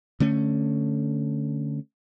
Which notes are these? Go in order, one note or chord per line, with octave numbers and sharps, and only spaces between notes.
D3 A3 C#4